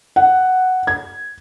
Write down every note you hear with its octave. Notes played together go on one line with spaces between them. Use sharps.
F#5
G#6